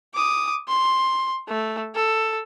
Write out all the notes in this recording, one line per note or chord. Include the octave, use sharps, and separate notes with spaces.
D6 D#6
C6
A3
A4